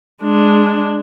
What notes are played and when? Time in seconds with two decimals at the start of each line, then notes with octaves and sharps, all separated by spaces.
0.23 G#3 D4